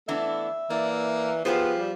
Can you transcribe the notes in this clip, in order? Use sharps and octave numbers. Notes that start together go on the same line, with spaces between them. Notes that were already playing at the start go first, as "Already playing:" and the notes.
E3 A3 B3 D4 E5
E3 A#3 D5
F3 B3 F4 G4 G#4 C5
G3